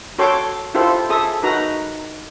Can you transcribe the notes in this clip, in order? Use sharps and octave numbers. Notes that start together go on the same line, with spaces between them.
F#4 A4 C#5 G5 C6 D6
E4 F4 G4 A4 C5
G#4 A4 E5 D#6
D#4 F#4 B4 A#5